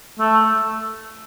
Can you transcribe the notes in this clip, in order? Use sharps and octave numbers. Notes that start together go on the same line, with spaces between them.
A3